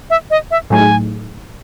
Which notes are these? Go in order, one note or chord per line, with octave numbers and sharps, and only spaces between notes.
E5
D#5
E5
A2 F#3 A3 D#4 G#4 G#5